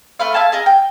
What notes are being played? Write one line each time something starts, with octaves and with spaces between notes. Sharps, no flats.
A3 B4 F5
E5 F5 G#5 A5
G#4 A#4 D#5
G5